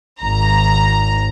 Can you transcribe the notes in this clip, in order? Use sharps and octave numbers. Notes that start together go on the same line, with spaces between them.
G#1 A#5